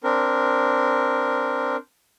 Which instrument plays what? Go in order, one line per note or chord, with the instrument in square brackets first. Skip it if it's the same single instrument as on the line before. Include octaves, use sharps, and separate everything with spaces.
[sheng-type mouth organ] C4 D4 A#4